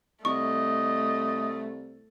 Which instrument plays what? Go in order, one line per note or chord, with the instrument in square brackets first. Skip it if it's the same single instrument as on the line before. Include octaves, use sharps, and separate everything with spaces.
[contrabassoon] C2 [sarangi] A3 [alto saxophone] D#5 [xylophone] C#6